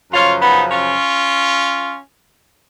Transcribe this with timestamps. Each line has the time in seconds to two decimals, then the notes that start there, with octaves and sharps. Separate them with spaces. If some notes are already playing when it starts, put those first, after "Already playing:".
0.12 F#2 C#3 F3 C#4 F4
0.41 B3 D#4
0.71 C#4 F4